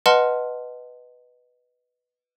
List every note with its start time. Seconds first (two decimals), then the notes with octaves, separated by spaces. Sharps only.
0.06 B4 D#5 F#5 A5 C6 F6